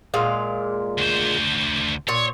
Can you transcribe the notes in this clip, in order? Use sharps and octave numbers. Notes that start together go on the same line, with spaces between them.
A#2 G#3 F5
D2 C5
A#2 C#5